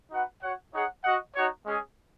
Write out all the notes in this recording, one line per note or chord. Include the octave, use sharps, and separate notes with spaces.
D#4 F#4 B4 F#5
F#4 C#5 F#5
D#4 G#4 C#5 F#5
F#4 D#5 F#5
D#4 F#4 C#5
G#3 C#4 G#4